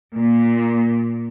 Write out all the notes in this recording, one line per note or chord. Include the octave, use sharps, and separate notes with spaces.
A#2